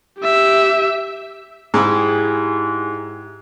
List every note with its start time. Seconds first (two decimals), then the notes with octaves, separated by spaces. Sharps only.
0.19 G4 E5
1.74 G#2 E4 G4 G#4